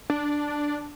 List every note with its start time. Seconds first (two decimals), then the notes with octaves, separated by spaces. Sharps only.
0.10 D4